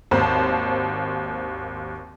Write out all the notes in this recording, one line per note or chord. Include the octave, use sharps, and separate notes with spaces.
G#1 D#2 C5 A5 B5